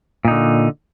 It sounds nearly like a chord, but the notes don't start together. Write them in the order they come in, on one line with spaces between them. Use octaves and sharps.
A#2 D#4 D3